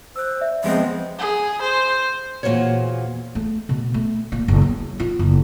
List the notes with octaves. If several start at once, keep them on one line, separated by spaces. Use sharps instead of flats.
C5 E6 F#6
D5 E5
F2 G#3 B3 C4
G#4
C5
E2 A#2 G3 F#4 C5 C#5
A3
B2
A3
A#2
F#1
F#3
F4
F#1